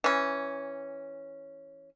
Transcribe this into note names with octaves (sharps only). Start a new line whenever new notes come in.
E3 C#4